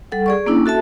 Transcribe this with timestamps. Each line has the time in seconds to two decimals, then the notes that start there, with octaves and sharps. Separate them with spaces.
0.12 G3 A4 F#5
0.26 G#4 D5 C#6
0.46 A#3 C#4 D4 E4
0.66 F#4 A4 E5 A5